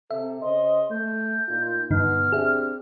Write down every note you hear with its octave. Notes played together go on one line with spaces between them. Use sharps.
C3 A4 E5
C#3 C5 D#5 C6
A3 G6
A#2 D#4 F4
G2 B2 D3 D#4 F6
C4 D4 G4 G#4 E5